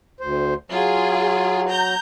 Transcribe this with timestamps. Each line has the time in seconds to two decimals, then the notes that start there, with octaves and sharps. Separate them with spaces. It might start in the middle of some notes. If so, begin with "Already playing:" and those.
0.20 D2 C5
0.71 F#3 F4 G#4
1.70 A#5 G6